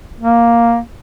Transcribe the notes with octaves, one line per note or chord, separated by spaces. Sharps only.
A#3